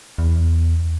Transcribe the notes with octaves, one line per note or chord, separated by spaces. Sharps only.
E2